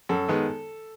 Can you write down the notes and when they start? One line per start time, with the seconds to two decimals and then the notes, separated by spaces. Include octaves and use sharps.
0.09 F#2 A4
0.28 D#3 G#3 B3